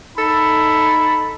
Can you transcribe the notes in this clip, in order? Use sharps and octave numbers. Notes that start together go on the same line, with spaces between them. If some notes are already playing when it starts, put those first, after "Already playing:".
D#4 A4 B5